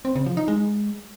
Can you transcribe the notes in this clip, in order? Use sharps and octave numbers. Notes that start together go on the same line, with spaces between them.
C4
C#3
F3
D#4
G#3